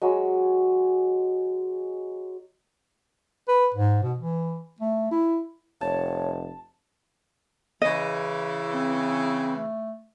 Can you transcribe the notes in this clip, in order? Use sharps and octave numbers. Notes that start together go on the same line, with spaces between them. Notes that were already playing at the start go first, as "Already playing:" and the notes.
F#3 G#3
B4
G#2
B2
E3
A3
E4
F1 C#5 A5
C#3 E3 D#5
C4
A3